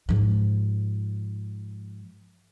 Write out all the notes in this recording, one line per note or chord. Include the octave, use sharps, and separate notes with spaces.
G#2 F3